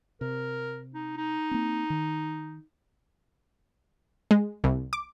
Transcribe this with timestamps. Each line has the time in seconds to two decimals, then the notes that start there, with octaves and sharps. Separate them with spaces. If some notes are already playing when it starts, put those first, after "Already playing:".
0.21 C3 A#4
0.94 D#4
1.17 D#4
1.51 A#3 C4
1.90 D#3
4.31 G#3
4.64 C2
4.93 D6